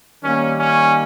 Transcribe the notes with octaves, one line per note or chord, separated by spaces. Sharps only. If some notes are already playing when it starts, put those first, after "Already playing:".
D#3 G3 A#3 C#4
C#4